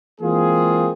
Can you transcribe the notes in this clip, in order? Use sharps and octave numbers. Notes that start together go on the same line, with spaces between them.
E3 G#3 A#3 C4 F4 G#4